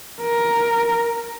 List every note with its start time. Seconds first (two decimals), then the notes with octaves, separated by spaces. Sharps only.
0.22 A#4